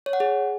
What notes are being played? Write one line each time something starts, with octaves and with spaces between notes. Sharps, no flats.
C#5
F#5
G#4